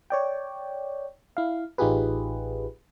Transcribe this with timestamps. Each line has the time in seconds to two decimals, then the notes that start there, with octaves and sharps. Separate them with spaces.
0.10 C#5 D5 G5
1.37 E4 F5
1.78 A1 D#4 F4 G4 G#4 B4